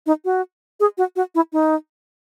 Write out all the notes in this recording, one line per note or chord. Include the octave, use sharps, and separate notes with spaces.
D#4
F#4
G#4
F#4
F#4
E4
D#4